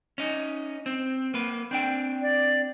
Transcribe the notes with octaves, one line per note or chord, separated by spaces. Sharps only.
C#4 D#4
C4
A#3 B4
C4 D4 G5
D5